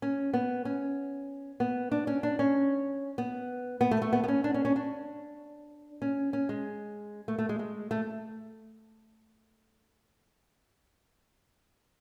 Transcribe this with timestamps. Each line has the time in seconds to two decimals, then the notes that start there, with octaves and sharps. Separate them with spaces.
0.02 C#4
0.33 B3
0.65 C#4
1.60 B3
1.92 D4
2.07 C#4
2.23 D4
2.39 C#4
3.18 B3
3.81 B3
3.91 A3
4.02 A3
4.13 B3
4.24 B3
4.28 C#4
4.44 D4
4.54 C#4
4.65 C#4
4.76 D4
6.02 C#4
6.33 C#4
6.49 G#3
7.28 A3
7.38 A3
7.49 G#3
7.59 G#3
7.91 A3